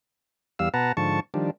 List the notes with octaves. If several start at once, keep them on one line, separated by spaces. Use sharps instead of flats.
E2 G3 F5 E6
B2 B4 F#5 A5 A#5
G#2 D3 F3 A5 C#6
D#3 F3 G3 D4